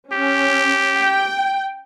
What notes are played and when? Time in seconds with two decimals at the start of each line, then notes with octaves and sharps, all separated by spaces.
0.12 C#4 G4
0.97 G5